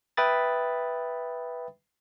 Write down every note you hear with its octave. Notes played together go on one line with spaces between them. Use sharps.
B4 E5 G5 B5 D#6 A6